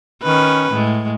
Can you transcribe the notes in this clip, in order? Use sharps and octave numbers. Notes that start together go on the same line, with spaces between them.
D#3 C#4 B4
A2 G#3